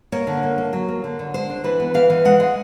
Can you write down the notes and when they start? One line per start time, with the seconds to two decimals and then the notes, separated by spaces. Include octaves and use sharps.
0.12 A#3 C#5
0.27 D3
0.43 A#3
0.58 A#3
0.73 F#3
0.88 A#3
1.04 D3
1.19 D3
1.34 G#3 C5
1.50 D4
1.64 E3 B4
1.80 B3
1.94 E3 F5
2.10 E3
2.25 G#3 F#5
2.40 G#3